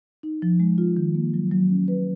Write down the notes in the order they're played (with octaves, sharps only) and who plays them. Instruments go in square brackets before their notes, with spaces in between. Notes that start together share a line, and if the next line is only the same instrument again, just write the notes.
[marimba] D#4
F3
G#3
F4
D#3
A#3
F#3
F#3
C#4
B4